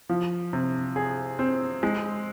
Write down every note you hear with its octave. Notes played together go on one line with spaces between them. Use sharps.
F3
C3
G#4
C4
G#3